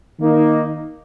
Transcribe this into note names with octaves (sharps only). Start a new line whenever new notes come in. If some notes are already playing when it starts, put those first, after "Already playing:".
D#3 A#3 D#4